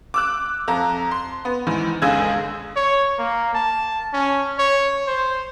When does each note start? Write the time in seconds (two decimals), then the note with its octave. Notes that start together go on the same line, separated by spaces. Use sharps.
0.14 D6 E6 F#6
0.68 F2 A#5
1.11 C6
1.45 B3
1.67 G#2 D#3 E3
2.02 G1 C#2 G#3 G#4 E6 G#6
2.76 C#5
3.19 A#3
3.54 A5
4.13 C#4
4.58 C#5
5.07 C5